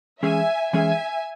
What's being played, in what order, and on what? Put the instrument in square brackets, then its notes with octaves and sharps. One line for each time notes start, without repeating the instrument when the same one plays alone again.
[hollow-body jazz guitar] E3 G#3 C#4 G#4 [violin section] E5 G#5
[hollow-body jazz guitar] E3 G#3 C#4 G#4 [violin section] E5 G#5